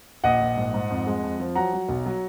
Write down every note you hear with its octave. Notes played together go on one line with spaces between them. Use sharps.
A#1 D#5 F#5
A#1
G#2
G#2
F2
G#3
F2
F3
F#3 F#5 A#5
F#3
B1
F#3